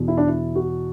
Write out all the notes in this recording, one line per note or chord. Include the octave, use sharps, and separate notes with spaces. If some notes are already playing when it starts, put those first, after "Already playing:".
Already playing: E2 B2
E4
D4
E4
F#4